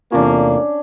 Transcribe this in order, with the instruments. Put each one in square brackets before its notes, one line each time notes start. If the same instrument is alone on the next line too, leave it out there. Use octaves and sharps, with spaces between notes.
[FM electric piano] E2 C3 F4 [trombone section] A2 A#3 [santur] C#4 D4